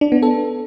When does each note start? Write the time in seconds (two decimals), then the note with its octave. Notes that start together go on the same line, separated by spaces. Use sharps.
0.01 D4
0.12 B3
0.23 A4